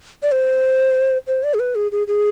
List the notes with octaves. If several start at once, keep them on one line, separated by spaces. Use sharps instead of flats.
D5
C5
C5
D5
G#4
B4
G#4
G#4
G#4